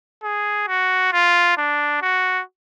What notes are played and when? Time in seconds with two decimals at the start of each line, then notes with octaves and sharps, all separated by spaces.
0.23 G#4
0.68 F#4
1.13 F4
1.57 D4
2.02 F#4